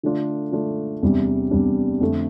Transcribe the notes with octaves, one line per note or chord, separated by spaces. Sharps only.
D3 A3 D4 F4
D3 A3 D4 F4
E2 C3 G3 D4
E2 C3 G3 D4
F2 D3 A3